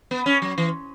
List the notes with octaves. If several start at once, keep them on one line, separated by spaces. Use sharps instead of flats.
B3
C#4
F#3
E3